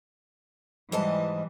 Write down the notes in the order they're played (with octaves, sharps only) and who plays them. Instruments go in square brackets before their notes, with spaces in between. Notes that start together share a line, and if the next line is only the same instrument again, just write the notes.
[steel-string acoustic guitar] G#2 D#5 A5 [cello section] E3 G3